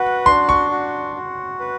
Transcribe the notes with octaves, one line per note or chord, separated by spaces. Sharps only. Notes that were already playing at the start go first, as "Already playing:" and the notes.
Already playing: F#4 B4 F#5
D4 C6
C#6
F#4
F#4
B4